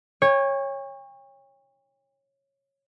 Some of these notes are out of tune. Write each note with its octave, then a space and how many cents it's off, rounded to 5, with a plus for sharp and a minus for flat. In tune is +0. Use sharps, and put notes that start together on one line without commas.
C#5 -10 G5 +45